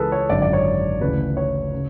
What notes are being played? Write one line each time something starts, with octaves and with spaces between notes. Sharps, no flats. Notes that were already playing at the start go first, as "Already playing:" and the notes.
Already playing: C#2 C#3 E3 G#4 A4 B4
C#5
G#1 F#2 D3 D5
D5
C#5
D2 C#3 E3 B4
C#5
C#3